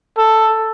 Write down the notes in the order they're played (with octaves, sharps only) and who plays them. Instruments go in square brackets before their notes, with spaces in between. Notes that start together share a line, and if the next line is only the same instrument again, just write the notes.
[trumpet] A4